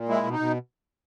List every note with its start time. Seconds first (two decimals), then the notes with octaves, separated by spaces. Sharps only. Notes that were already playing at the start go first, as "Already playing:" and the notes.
Already playing: A#2
0.09 G#3 E4
0.23 B2
0.32 D#4
0.39 B2